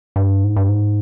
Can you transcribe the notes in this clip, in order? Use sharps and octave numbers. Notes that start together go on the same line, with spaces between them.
G2
G#2
G2
G#2